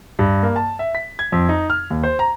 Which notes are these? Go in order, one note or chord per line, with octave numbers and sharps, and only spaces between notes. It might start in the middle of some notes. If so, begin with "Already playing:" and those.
G2
A#3
A5
E5
B6
G#6
F2
D#4
F6
D#2
C5
A#5